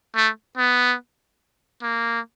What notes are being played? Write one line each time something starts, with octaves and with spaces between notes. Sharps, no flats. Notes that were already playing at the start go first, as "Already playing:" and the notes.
A3
B3
A#3